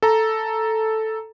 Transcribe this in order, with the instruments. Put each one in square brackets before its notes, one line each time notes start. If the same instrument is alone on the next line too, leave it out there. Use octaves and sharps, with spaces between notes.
[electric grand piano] A4 A#5